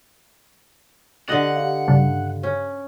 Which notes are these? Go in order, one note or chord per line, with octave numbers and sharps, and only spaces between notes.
D3 G4 D#5 F#5 F#7
G4 F5
G2 C#3 D4
C#4